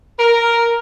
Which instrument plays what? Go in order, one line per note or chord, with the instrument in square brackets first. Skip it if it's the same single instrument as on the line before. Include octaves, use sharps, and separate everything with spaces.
[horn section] A#4